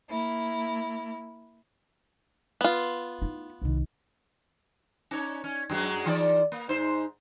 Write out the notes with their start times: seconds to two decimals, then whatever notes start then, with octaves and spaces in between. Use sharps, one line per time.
0.10 A#3 E4
2.61 B3 F4
3.22 D#4 E4
3.62 C2 D#3
5.11 C#4 D#4 C#5
5.44 C#4
5.70 F#2 F#3 G#3
6.06 E3 D#4 D5
6.52 A#3
6.69 G#2 D#4 C5